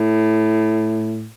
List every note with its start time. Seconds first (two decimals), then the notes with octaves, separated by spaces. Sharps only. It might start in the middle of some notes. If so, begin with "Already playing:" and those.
Already playing: A2